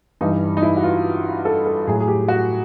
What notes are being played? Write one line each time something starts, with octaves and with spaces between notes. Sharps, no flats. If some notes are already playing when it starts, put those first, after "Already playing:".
G2 E3 G3 D#4
D#4
E4
F#4
F4
A4
A4
A2 F#3 G#4
G#4
G4
F#4